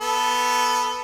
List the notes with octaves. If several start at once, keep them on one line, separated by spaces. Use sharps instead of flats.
B3 A4